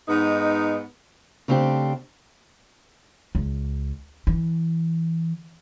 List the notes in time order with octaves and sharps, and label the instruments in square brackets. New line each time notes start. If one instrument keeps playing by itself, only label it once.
[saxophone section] G#2 B3 D#4
[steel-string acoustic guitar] C#3 A3 C4 D4 G4
[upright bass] C#2
E3